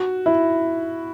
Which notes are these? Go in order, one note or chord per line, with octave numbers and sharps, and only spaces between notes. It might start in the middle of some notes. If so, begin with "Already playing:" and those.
Already playing: F#4
E4